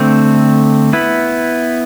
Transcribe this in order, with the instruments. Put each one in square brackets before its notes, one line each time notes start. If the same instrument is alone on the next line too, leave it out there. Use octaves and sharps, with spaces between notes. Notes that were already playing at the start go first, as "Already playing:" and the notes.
Already playing: [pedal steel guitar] D3 A3 C4
B3 E4 B4